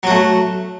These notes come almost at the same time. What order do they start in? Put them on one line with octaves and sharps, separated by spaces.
F#3 F#4 A3